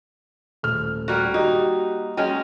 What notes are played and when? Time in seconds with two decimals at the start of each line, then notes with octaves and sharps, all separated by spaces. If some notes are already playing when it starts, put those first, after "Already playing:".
0.63 D#1 A3 F6
1.08 G3 A#3 F#4
1.34 D#4 F#4 G4
2.17 F#3 G#3 C#4 G5